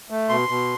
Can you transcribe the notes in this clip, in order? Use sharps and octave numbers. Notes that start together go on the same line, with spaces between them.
A3
B2 C6
B2